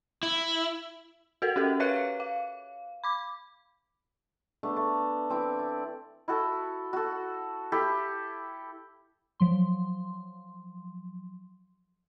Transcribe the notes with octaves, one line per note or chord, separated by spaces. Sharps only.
E4
F#4 A4 A#4
C#4 G4 A4 A#4
B4 C#5 E5 F5 F#6 C#7
F5
B5 D6
A3 B3 D4
A3
E3 C4 D6
D5
E4 F#4 A4
F#4 A4
E4 G4 A4
F3 F#3 C6